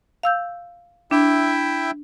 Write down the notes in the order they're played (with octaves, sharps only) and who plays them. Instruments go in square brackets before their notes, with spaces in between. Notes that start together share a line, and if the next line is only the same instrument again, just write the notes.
[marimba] F5 E6 G6
[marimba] D4 [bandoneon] E4 E5 G5